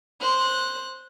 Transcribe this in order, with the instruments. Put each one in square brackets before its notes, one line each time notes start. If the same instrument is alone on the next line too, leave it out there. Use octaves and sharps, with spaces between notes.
[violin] C5 F#6